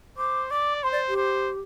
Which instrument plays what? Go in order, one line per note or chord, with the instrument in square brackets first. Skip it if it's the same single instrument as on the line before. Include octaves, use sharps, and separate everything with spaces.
[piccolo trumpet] C5 [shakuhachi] D6
[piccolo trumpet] D5 [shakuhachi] D6
[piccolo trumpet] C5 [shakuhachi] C6
[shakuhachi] D5
G4
[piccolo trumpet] C5